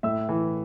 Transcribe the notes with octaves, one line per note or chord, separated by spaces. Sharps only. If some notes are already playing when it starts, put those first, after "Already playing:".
A2 E5 E6
E3